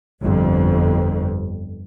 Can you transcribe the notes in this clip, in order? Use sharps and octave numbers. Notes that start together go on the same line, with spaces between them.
G1 F2